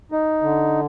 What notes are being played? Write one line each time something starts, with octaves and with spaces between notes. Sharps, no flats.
D#4
D3